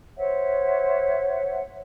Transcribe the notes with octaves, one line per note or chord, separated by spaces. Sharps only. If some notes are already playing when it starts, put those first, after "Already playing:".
C5 C#5 E5 F#5